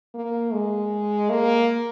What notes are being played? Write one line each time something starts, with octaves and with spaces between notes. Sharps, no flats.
A#3
G#3
A#3